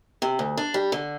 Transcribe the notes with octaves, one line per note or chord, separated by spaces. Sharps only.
C3
D2
D4
G3
D3